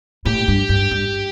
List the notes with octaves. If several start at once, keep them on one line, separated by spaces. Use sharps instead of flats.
A2 G4
G2
G2
G2